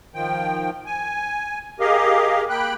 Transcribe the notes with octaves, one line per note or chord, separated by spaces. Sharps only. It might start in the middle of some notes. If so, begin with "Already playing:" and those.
D#3 F3 G5
G#5
G4 G#4 A#4 D#5 F5
A#3 G5 B5 F#6